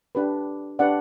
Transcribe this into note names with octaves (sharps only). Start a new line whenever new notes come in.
D4 G4 B4
D4 G4 B4 D5 F#5